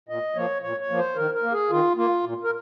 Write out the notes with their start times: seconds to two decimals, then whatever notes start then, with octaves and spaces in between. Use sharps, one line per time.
0.09 A#2 D#5
0.36 F3 A#3 C#5
0.62 A#2 C#5
0.80 C#5
0.90 F3 A#3
0.98 C5
1.16 D#3 A#4
1.34 A#4
1.43 A#3
1.52 G#4
1.70 D#3 F4
1.96 A#3 F4
2.24 A#2
2.44 A#4